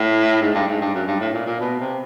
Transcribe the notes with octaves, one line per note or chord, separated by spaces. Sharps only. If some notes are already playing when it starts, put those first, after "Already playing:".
Already playing: A2
G#2
G2
G#2
G2
F#2
G2
A2
A#2
A#2
B2
C3